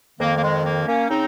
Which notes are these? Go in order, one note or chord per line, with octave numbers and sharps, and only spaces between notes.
F2 D#3 A#3
A#3
G#3
A#3
A#3 C#4
C#3 C4 D#4